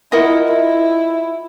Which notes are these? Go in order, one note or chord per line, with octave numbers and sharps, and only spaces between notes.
E4 F4 A#4 D#5 F#5
E4